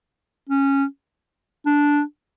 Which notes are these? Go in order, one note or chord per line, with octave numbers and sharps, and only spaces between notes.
C#4
D4